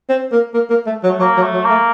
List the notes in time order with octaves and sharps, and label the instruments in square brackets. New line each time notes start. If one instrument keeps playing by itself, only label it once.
[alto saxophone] C4
A#3
A#3
A#3
A3
F#3
[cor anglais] A3
[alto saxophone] F#3 [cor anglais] A#3
[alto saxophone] F#3
[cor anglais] A3
[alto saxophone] F#3
[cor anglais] A#3
[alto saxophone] A3